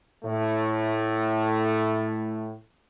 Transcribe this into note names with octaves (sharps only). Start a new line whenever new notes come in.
A2 A3